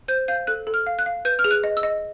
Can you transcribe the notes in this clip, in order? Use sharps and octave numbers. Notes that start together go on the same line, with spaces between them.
C5 G6
F5 G6
A4 F#6
A4
F6
F5
F#6
F5
B4 G6
F6
G#4
F#6
D#5
E6
D#5